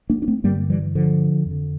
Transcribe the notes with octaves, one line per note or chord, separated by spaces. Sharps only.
A#3 D4
D4
A3 C4
G2 D3 G3 A#3
E3 G3
D3 F3
F2
D3